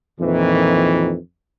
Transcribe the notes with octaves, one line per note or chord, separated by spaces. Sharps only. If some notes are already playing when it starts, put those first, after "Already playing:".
F2 A#2 D#3 E3